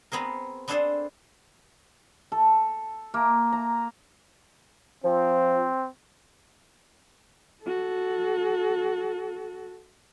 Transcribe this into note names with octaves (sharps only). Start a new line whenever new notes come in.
B3 C4 G#4 A#4
B3 C4 D4 G#4 A4 C5
A4
A#3
A#5
F3 C4
F#4 A4